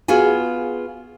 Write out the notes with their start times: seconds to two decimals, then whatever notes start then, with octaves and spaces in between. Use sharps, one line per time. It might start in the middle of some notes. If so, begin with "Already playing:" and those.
0.08 B3 F4 F#4 G#4 G#5